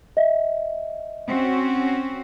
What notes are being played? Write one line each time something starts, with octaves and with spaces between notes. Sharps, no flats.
D#5 E5
C4 C#4 F#4